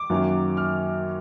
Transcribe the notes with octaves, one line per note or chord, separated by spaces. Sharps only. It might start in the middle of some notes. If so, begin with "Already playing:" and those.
Already playing: D6
F#2 D#3 F#3 A#3
F6